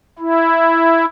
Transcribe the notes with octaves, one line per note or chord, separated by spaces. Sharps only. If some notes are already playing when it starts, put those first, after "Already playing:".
E4